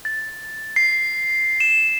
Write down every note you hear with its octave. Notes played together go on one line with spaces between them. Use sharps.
A6
C7
E7